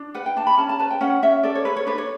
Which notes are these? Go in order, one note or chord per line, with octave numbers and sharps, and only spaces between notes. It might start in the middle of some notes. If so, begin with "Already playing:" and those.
Already playing: D4
B4 F#5
G5
D4 A5
B5
C#4 A5
A5
B4 A5
G5
C#4 F#5
C#4 E5
A4 D5
C#5
A4 B4
C#5
D4 B4
C#5